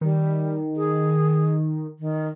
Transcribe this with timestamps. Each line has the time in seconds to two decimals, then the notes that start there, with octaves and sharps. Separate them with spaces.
0.01 D#3 G3
0.76 G#4
1.99 D#3